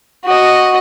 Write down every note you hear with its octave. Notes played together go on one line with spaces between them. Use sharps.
F#4 D#5